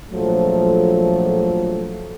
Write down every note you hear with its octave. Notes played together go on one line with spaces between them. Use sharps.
A#1 F3 F#3 A3 A4